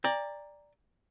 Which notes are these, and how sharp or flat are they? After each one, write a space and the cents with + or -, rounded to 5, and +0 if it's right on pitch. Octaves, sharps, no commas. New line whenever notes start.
D5 +0 G5 +45 A#5 +0